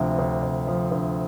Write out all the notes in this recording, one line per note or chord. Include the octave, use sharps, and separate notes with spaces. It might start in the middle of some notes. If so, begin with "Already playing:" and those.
Already playing: D2 C3 F3
D2
C3
F3
D2